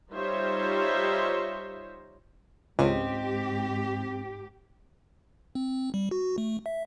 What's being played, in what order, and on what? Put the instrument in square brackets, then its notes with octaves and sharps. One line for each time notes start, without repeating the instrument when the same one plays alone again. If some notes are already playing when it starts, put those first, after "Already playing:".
[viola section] G3 D#4 F4 C5 C#5 E5
[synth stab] C#2 [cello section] G#2 G4 [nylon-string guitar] C4 D#5
[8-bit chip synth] C4
G3
F#4
A3
E5